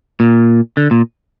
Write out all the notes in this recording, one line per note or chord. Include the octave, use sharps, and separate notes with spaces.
A#2
D3
A#2